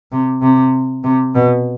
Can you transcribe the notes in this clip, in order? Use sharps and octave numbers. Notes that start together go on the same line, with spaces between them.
C3
C3
C3
B2